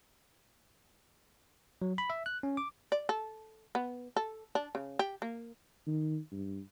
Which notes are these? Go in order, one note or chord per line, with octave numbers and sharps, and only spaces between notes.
F#3
B5
E5
F#6
C#4
D6
D5
A4
B3
A4
D4
C#3
G4
A#3
D#3
G2